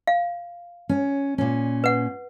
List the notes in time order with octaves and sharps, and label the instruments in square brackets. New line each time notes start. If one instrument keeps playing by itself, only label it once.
[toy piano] F5
[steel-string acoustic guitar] C#4
A#2 C#4
[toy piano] B4 F#5